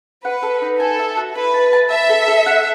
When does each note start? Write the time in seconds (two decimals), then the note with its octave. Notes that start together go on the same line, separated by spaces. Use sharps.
0.24 B4 F#5
0.43 A4
0.62 D#4
0.80 A4 G#5
0.99 E5
1.17 F#4
1.35 E4 B4
1.54 A5
1.73 A5
1.91 E5 A5
2.09 A4
2.28 A4
2.46 F#5